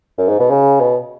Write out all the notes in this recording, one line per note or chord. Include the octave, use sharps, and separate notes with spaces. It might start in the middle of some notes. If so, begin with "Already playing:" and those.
F#2
G#2
B2
C#3
B2